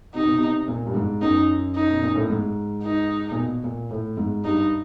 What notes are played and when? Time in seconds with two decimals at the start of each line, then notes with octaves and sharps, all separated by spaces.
0.14 C3 D#4
0.25 B2
0.36 C3
0.68 A#2
0.86 G2
0.95 G#2
1.21 F#2 D#4
1.75 D#4
1.89 B2
2.02 A#2
2.15 A2
2.29 G#2
2.83 D#4
3.32 A#2
3.37 B2
3.64 A#2
3.91 A2
4.17 G#2
4.45 G2 D#4